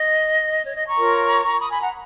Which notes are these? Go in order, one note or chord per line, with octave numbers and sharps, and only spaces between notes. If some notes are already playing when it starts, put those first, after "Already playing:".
Already playing: D#5
C#5
D#5
A#5 C#6
F4 A#4 C#5
B5 D#6
G#5 B5
F#5 A#5